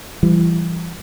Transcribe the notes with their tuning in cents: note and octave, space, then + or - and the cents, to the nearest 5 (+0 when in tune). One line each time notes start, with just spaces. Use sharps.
E3 +35 G3 +0